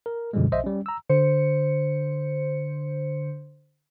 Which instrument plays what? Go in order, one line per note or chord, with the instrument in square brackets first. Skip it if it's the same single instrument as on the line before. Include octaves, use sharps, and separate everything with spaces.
[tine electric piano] A#4
F#2 B2 D3 F3 G3 G#3
A#1 C5 D#5 E5
G3 C#4
A#5 E6
[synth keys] D3 C5 C#7